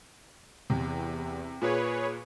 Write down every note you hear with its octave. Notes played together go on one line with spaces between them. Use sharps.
E2 C3
A#2 G#4 B4 C#5